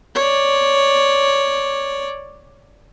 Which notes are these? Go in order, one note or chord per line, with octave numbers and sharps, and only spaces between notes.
C#5 D5